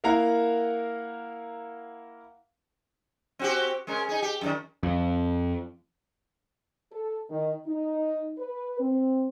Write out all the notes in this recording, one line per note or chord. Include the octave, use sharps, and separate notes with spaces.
A#3 E4 A#4 F5 F#5 A#5
C4 F#4 G4
G#3 C#4 A#4
D#4 G#4
G4
F#2 A2 D#3
F2
A4
D#3
D#4
B4
C4